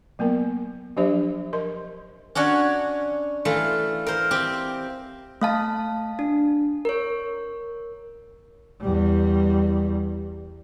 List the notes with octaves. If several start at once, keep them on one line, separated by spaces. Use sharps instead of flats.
F#3 A#3 B3 A#4
F3 F#3 D4 G4 C5 E5
A#4 D#5 C6
C#4 D4 F#4 C#5
E3 A3 F4
A#4 C5
C4 G4
A3 F5 A5
D4
A#4 C#5
E2 G3